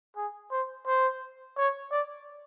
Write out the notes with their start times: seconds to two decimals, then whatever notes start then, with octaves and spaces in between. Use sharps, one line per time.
0.16 G#4
0.51 C5
0.87 C5
1.57 C#5
1.91 D5